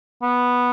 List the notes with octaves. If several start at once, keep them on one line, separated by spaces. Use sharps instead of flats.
B3